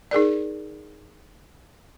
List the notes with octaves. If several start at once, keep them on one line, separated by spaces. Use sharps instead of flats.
D#4 G#4 A#4 D5